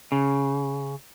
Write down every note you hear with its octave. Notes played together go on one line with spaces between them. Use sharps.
C#3